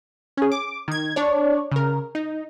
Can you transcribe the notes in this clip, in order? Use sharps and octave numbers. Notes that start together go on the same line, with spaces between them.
C#4 G#4
D6
D#3 G#6
D4 C#5 D5
C#3 A#4
D#4